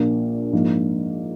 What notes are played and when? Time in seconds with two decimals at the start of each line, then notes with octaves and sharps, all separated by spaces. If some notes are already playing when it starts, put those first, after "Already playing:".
Already playing: A#1 A#2 A#3
0.53 G#2 F3 A#3